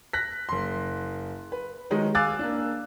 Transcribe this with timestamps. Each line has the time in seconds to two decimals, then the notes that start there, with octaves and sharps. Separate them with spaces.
0.13 F#6 A#6 B6
0.49 F#1 C6
1.52 B4
1.91 D#3 F#3 G#3 D#4
2.15 F5 G#5 D6 E6 F#6 A6
2.39 A#3 D4